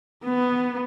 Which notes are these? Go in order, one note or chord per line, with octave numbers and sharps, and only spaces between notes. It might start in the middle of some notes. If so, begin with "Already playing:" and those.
B3